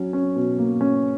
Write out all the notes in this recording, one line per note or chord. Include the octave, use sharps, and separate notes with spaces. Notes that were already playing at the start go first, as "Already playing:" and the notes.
Already playing: F#3 C#4
C#4
B2
A#3
C#4